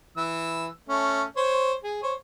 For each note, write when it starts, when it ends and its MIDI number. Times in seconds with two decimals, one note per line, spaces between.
0.17 0.67 52
0.17 0.67 88
0.89 1.23 57
0.89 1.23 61
1.37 1.73 72
1.37 1.73 73
1.84 2.00 68
2.03 2.14 72
2.03 2.14 73